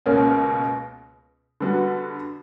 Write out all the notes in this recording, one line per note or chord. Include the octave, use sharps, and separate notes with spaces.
C#2 B2 A#3 C#4
D3 G3 B3 F#4